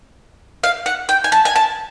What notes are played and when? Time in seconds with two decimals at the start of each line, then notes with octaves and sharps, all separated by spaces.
0.64 F5
0.86 F#5
1.09 G5
1.24 G#5
1.32 A5
1.45 G#5
1.56 A5